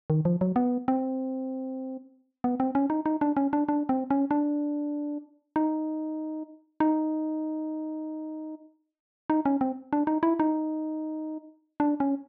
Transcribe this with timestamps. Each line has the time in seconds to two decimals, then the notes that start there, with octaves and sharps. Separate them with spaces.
0.10 D#3
0.25 F3
0.41 F#3
0.56 B3
0.88 C4
2.44 B3
2.60 C4
2.75 C#4
2.90 D#4
3.06 D#4
3.21 D4
3.37 C#4
3.53 D4
3.69 D4
3.89 C4
4.11 C#4
4.31 D4
5.56 D#4
6.80 D#4
9.30 D#4
9.46 C#4
9.61 C4
9.93 D4
10.07 D#4
10.23 E4
10.40 D#4
11.80 D4
12.00 C#4